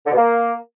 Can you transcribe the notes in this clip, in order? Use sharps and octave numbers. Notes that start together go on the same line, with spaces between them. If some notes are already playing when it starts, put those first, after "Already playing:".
D3
B2
A#3